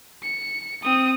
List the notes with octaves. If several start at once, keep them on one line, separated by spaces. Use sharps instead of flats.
C#7
C4 D#6